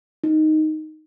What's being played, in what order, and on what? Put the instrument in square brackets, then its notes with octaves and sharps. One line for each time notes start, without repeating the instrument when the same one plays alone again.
[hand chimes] D#4